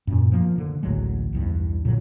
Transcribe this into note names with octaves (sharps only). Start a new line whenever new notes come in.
F#2 A#2
F3 A#3
D3
A1 D2 F#3 G#3
B1 E2 G2
A#2 D3 F#3